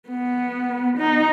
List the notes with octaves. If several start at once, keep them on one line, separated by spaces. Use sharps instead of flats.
B3
D#4